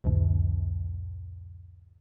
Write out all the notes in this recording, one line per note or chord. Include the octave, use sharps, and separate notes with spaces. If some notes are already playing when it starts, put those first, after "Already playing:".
C2 F2 A2 D3